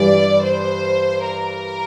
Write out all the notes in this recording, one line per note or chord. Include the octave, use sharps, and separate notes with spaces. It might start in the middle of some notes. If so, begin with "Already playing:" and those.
Already playing: G2 E3 G3 D5
C5
A#4